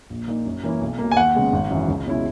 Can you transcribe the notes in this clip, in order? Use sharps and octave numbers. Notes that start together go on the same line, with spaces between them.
A#1
A#2 A#3 D#4
F#2
E3 A#3 C#4 E4
B1
B2 A#3
G#5
D#2 F#5
C#3 G#3 B3
G#1
F#2 E3
C#2
B2 G#3 C#4 E4